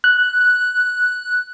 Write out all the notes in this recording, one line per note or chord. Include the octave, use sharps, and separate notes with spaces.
F#6